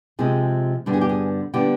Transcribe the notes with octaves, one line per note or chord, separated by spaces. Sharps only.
C3 F3 G#3 C4 G#4
G2 D3 G3 B3 A4
G#4
G4
G#4
D3 G3 B3 G4